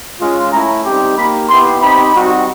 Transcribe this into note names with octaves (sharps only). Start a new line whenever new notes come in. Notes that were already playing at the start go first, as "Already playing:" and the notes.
G#3 C#4 F4
A3 C#4 E4 A#5
G3 C4 D#4 G4
A#3 D#4 G4 B5
B3 E4 G4 C6
C4 D#4 G4 B5
G3 C4 D#4 F#4